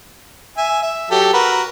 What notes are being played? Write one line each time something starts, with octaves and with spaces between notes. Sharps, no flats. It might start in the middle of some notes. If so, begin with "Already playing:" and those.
E5 G#5
E5
F#3 G4 A4
F#4 A#4 B4